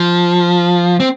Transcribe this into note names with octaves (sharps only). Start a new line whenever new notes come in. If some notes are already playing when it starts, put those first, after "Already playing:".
Already playing: F3
C4